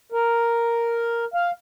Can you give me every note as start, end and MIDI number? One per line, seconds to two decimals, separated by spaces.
0.12 1.25 70
1.34 1.51 77